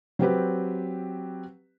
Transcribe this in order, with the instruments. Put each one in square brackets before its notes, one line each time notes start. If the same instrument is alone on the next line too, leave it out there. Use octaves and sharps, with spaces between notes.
[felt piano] F#3 C4 G4 B4